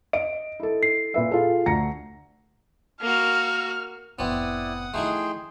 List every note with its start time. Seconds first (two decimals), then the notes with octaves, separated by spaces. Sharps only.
0.13 D#5 D7
0.60 E4 A4
0.83 C7
1.14 A#2 B4 E5
1.31 F4 G#4 A4
1.66 D2 A#5 A#6 C#7
3.01 A#3 F#4 F6
4.19 F1 A2 B3 C4 E4 D5 F#5 D#6
4.94 D3 F3 A3 D#4 E4 G#4 G5 C6